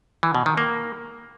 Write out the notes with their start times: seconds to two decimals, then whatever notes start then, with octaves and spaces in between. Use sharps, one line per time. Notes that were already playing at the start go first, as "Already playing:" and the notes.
0.23 E3
0.35 B2
0.46 D#3
0.57 A#3